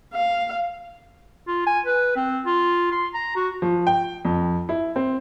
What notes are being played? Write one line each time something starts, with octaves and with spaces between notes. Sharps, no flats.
F5
F4
G#5
B4
C4
F4
C6
A#5
F#4
F3
G5
F2
E4
C4